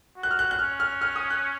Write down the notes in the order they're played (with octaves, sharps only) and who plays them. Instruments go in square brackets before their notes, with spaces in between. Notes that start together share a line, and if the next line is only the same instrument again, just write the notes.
[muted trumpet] F#4
[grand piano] F#6
F6
F#6
F#6
[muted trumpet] C#4 [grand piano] F6
[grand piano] F6
F6
D#6
F#6